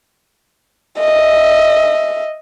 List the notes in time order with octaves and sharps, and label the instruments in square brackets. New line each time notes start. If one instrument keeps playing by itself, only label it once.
[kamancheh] D#5 E5